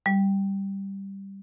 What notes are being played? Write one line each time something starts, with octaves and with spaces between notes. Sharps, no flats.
G3